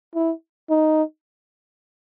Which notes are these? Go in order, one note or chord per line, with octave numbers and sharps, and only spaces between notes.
E4
D#4